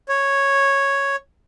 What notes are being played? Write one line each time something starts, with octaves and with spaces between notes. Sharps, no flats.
C#5